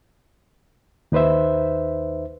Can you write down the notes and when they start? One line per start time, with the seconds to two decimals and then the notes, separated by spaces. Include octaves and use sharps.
1.12 D#2 D#4 B4 C5 E5